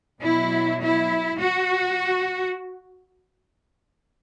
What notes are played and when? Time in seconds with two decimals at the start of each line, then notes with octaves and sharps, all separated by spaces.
0.21 B2 F#3 E4
0.80 E4
1.38 F#4